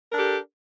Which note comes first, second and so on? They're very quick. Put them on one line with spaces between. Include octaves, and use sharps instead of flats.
D4 A#4 A4 G4